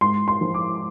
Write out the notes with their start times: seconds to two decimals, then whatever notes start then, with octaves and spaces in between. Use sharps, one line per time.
0.01 G#2 C6
0.28 C6
0.41 F3
0.54 D6